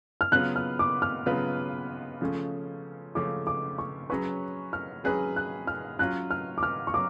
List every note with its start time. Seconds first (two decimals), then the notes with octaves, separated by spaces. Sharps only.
0.21 F6
0.32 C#3 F#3 B3 F4 B4 F#6
0.56 F6
0.79 D6
1.02 F6
1.26 C#3 F#3 B3 F4 B4
2.21 C#3 F3 A3 C#4
3.15 C#3 F3 A3 C#4 D6
3.47 D6
3.78 C#6
4.10 F#3 C#4 G#4 B4 C#6
4.73 F6
5.04 F#3 C#4 G#4 B4 F#6
5.36 F#6
5.67 F6
5.99 F#3 C#4 F4 F#6
6.31 F6
6.58 D6
6.63 F6
6.87 C#6
6.94 F#3 D6